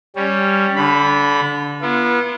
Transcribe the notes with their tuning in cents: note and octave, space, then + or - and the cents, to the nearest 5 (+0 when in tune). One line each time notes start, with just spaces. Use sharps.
G3 +0 C#4 +0
D3 -25 B5 +0
B3 -35 F4 -40